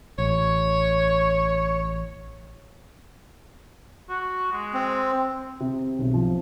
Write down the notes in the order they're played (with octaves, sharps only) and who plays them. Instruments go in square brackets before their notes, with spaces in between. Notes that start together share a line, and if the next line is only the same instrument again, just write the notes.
[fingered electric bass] A1 [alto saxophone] C#5
[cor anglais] F#4
G#3
[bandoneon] C4
[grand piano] C3
B1
F3